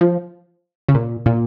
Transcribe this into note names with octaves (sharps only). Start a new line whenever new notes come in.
F3
C#3
A#2
A#2